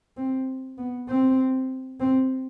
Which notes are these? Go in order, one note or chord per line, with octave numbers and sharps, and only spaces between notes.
C4
B3
C4
C4